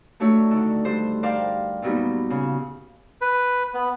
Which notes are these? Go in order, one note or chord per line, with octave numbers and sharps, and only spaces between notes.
F#3 A3 D4 E4 C#5
D3 D#3
G2 C5
A#4 C5 D5 F5 G5
A#2 F#3 G3 B3 D#4
C#3
B4
B3